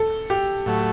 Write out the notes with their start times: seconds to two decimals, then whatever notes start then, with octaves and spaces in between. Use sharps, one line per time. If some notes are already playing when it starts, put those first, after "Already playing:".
Already playing: A4
0.30 G4
0.66 A2 F#3 A3